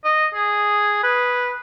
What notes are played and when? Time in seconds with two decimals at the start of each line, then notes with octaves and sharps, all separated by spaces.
0.05 D#5
0.34 G#4
1.03 B4